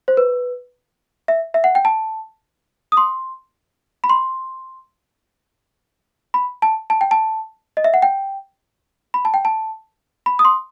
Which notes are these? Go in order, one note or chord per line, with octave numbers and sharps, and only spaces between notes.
C5
B4
E5
E5
F#5
G5
A5
D#6
C6
B5
C6
B5
A5
A5
G5
A5
D#5
E5
F#5
G5
B5
A5
G5
A5
B5
D#6
C6